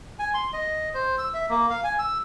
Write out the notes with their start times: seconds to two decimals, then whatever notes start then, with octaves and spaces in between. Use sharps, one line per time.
0.19 G#5
0.34 C6
0.53 D#5
0.94 C5
1.18 E6
1.34 E5
1.49 A#3
1.70 F5
1.84 G#5
1.99 E6